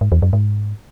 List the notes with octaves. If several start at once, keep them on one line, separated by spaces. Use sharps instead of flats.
G#2
E2
F#2
G#2